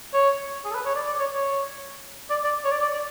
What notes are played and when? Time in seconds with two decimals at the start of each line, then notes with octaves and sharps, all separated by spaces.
0.13 C#5
0.65 G#4
0.71 A4
0.75 B4
0.85 C#5
0.95 D5
1.06 D5
1.19 C#5
1.34 C#5
2.30 D5
2.44 D5
2.65 C#5
2.71 D5
2.82 D5
2.92 D5